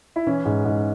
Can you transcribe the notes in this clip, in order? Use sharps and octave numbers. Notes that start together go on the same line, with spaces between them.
E4
E3 C#4
G#2
G#2